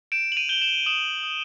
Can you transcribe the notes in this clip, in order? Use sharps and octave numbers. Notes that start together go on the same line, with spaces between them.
G6 D7 E7
F#7
D#7 F7
G6 G7
E7 F#7
D#6 E7 F#7
D#6